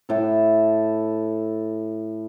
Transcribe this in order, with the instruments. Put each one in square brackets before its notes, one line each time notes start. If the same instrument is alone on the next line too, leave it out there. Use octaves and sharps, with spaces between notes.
[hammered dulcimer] A2 A4